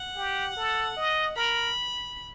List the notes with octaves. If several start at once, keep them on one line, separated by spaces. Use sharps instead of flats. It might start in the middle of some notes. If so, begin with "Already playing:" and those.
Already playing: F#5
G4
A4
D#5
A#4 B5